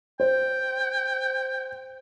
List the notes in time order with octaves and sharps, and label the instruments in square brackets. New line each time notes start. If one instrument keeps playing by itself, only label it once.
[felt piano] C5 [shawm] G5